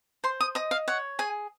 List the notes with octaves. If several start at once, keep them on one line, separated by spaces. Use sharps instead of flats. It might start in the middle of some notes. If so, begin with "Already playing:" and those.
C5 C6
D#6
D#5 D#6
F5
C#5 F#5
G#4 G#5